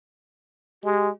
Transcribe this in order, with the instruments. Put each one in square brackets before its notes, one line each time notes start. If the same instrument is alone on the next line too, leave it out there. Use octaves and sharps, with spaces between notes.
[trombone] G#3 [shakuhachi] G4